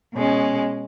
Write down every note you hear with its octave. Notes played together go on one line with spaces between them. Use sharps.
B2 G#3 C#4